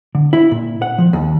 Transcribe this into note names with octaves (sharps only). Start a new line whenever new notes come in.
D3
E4
A#2
F#5
F3
D#2